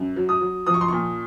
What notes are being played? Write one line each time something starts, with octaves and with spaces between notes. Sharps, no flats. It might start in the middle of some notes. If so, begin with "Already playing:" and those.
Already playing: F#2
F#3
D#6
F#3
F3 D#6
C#6
C6
A#2 C#6